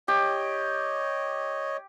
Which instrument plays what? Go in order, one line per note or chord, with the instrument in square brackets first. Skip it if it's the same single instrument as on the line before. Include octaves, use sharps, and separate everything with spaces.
[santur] G4 [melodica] C#5 D#5